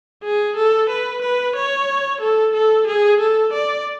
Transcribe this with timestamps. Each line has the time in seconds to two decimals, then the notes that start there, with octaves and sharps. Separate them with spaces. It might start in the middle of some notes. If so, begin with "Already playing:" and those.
0.23 G#4
0.57 A4
0.90 B4
1.22 B4
1.56 C#5
2.21 A4
2.54 A4
2.87 G#4
3.20 A4
3.53 D5